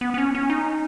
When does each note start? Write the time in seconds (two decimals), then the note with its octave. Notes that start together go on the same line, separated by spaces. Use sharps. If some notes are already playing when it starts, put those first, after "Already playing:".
0.01 B3
0.14 B3
0.18 C#4
0.35 C#4
0.50 D#4